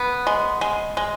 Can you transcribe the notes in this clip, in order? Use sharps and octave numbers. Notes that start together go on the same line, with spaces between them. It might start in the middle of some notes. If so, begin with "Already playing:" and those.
Already playing: B3
G#3
G#3
G#3